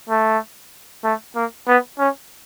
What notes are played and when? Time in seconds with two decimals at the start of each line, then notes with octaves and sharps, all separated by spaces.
0.09 A3
1.04 A3
1.36 A#3
1.68 B3
1.99 C#4